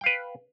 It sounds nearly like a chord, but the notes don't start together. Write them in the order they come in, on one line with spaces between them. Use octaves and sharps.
G5 F5 B4